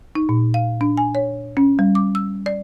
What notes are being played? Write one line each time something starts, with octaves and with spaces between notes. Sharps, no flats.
D#4
A#2
F5
D4
G#5
C#5
C#4
G3
D6
E6
D5